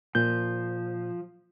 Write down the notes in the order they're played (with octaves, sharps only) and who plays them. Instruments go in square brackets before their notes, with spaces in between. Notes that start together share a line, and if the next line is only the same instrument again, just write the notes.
[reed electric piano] A#2 G6 [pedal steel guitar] F3